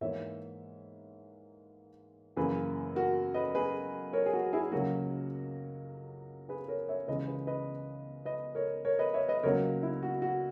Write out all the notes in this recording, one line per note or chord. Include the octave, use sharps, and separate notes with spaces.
G#2 E3 A#3 C#5 E5
F#2 C#3 E3 A#3 G#4 B4
F#4 A#4
B4 D#5
G#4 B4
A#4 C#5
G#4
F#4
E4 G#4
C#2 C#3 F#3 A#3 F#4 A#4
G#4 B4
A#4 C#5
C#5 E5
C#2 C#3 E3 G#3 B4 D#5
B4 D#5
B4 D#5
B4 D#5
A#4 C#5
A#4 C#5
B4 D#5
C#5 E5
B4 D#5
C#2 C#3 F#3 A#3 A#4 C#5
E4
F#4
F#4